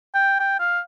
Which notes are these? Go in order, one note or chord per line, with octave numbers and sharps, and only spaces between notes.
G5
G5
F5